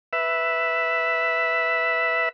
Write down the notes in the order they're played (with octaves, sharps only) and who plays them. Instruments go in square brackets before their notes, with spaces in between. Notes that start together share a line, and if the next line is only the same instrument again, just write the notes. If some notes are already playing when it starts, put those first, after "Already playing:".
[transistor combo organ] B4 E5